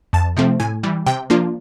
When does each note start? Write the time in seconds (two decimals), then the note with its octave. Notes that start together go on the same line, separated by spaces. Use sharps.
0.13 F2 A5
0.37 C3 F3 A3 C4
0.60 A2 G#5
0.83 E3 G3
1.06 C3 G5
1.30 F3 A#3 D4 F4